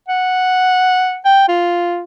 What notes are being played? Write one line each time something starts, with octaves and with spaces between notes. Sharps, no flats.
F#5
G5
F4